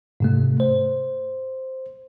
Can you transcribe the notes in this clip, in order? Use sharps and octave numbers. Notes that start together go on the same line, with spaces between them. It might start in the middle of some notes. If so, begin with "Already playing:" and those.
G#2 C3 A3
C5